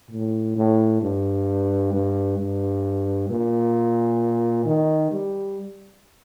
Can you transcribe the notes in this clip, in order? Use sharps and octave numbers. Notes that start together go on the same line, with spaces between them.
A2
A2
G2
G2
G2
A#2
D#3
G3